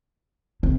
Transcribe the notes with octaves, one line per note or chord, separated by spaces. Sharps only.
C3